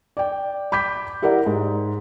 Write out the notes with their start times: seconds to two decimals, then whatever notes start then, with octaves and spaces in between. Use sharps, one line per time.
0.17 D5 G5
0.72 B5 D6 G6 B6
1.22 E4 G4 A#4 D5 E5 F#5
1.46 G#2